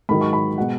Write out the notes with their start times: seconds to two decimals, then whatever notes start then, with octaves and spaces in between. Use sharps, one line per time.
0.09 G#2 D#3 F#3 B5
0.21 C#6
0.33 B5
0.58 B2 G#3 F#5